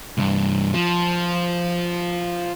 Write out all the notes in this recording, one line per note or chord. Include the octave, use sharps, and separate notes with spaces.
C2 G2
F3